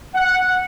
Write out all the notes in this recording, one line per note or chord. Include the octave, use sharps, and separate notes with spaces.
F#5